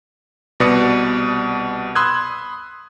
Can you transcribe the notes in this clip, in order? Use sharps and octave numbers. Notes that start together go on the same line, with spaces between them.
C2 B2 B4 D5 D#6 C#7
B5 C6 D#6 E6 F#6 G#6